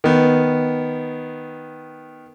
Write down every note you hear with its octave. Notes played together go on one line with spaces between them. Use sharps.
D#3 B3